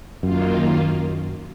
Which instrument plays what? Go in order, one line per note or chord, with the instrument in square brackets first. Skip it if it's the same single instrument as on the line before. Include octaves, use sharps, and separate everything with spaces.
[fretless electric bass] F#2 [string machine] D#3 A#3 F4